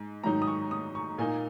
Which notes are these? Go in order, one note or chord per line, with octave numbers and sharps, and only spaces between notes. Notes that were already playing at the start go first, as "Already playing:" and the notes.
Already playing: G#2
G#2 D#3 F#3 D#4 A#5
D#6
C#6
D#6
C#6
A#2 A#3 D#4 G#5